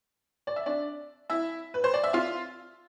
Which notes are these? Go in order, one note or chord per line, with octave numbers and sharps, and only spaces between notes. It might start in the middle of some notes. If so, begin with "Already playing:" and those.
D5
E5
D4 D5
E4 E5
B4
C5
D5
E5
F4 F5